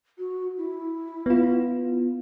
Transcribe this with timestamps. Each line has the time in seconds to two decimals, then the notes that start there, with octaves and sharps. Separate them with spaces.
0.18 F#4
0.57 E4
1.26 B3 F4